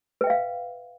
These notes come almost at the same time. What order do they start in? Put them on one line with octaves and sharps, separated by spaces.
B4 G5 E5 F5